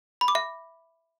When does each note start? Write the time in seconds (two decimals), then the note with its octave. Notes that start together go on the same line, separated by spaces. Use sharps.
0.21 B5
0.28 D6
0.35 E5